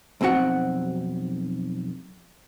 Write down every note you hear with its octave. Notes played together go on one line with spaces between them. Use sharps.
B1 F2 C4 F#4 F#5